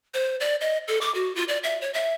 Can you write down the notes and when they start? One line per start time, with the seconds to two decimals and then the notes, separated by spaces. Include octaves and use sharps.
0.14 C5
0.40 D5
0.61 D#5
0.88 A4
1.01 D6
1.15 F#4
1.36 F4
1.48 D5
1.63 E5
1.81 C#5
1.94 E5